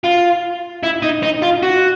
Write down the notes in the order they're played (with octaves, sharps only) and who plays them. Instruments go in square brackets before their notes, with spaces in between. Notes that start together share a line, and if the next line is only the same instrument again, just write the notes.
[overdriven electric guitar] F4
E4
D#4
D#4
F4
F#4